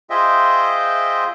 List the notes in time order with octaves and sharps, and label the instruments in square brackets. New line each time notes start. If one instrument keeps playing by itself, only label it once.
[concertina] F4 G#4 C5 D#5 E5 G5